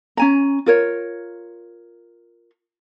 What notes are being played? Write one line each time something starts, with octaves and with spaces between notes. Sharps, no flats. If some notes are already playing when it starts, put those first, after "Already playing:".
C#4 G#5 A#5
F4 A#4 C#5